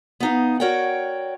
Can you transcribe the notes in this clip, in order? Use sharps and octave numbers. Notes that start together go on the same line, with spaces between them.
B3 D#4 F5
F#4 A#4 C#5 D5 F#5 G5